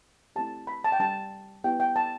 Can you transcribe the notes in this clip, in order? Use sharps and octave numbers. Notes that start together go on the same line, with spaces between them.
A3 C4 E4 G4 A5
B5
A5
G5
G3 D4 G4 A5
B3 E4 G4 G5
G5
A5